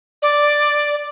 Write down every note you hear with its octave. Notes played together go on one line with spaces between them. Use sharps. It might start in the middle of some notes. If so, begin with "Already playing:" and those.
D5